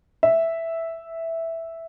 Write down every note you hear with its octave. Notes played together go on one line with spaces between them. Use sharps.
E5